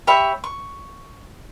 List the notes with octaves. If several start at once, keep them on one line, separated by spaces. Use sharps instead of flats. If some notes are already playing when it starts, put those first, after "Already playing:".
G4 C#5 E5 B5
C#6